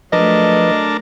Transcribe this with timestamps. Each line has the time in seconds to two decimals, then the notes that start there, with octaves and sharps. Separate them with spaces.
0.13 F3 F#3 A3 D4 A#4 B4 D#5 A5